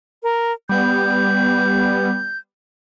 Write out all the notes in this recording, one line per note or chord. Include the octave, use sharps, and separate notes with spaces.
A#4
G3 B3 G6